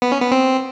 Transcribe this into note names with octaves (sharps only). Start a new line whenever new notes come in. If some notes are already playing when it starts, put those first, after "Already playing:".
B3
C#4
B3
C4